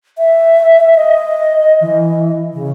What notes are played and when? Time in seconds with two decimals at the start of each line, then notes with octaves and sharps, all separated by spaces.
0.18 E5
0.95 D#5
1.81 E3
2.54 C#3